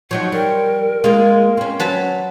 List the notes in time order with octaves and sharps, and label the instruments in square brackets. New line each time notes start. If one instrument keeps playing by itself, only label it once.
[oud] F3 F#3 D#4 [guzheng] C#5 [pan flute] F#5
[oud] G3 [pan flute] A#4
[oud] G#3 A#3 [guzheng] F4
[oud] C4 C#4
[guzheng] F#3 B4 A5